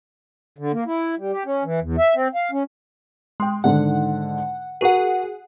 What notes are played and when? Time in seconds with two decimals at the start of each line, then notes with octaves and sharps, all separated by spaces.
0.58 D3
0.73 A#3
0.86 E4
1.18 G3
1.32 G4
1.45 C#4
1.65 E3
1.81 E2
1.98 E5
2.15 C4
2.35 F5
2.52 C#4
3.40 G#3 G5 C6
3.64 G#2 D3 D#3 F#5
4.81 F#4 G#4 A#4 F#5